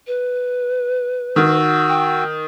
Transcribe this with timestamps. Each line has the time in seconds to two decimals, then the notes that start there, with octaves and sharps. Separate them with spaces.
0.07 B4
1.36 D#3 F#4 E6
1.89 G5